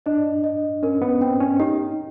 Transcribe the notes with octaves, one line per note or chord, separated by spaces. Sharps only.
D4 D#5
D#5
C#4 A#4
B3
C4 G5
C#4
D#4 G4